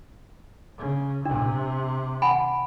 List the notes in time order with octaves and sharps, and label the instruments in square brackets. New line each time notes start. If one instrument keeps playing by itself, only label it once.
[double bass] C#3
[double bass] C3 [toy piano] D4
[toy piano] F#5 G#5 B5